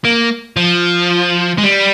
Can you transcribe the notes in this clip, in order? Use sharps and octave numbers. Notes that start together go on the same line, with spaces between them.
A#3
F3
G#3
G3